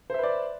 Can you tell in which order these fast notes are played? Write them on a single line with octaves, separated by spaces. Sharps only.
C5 E5 B4 D5